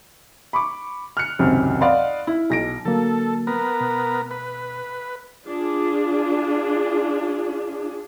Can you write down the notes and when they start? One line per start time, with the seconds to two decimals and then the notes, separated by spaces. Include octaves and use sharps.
0.53 B5 C#6 D6
1.17 F6 F#6 C#7
1.39 G#1 C#2 F#2 C3
1.81 D5 D#5 F5 F#5 B5 C6
2.27 E4
2.50 B1 A#6 D7
2.85 D3 F#3 A#3 A4
3.47 B3 A#4
3.81 B2
4.31 B4
5.45 D4 F4 G#4